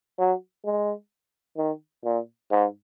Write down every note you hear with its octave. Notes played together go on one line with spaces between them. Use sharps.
F#3
G#3
D#3
A#2
G#2